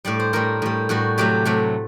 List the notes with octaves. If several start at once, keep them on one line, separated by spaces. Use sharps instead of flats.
A2 G3 D5
C5
A2 G3 A#4
A2 G3
A2 G3 F#4
C3 F#3 A3 G4
C3 F#3 A3